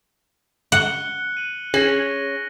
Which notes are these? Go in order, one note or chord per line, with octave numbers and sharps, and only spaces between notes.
F#5 F#6 C#7 G7
D#7 F#7
C#4 G#4 A#6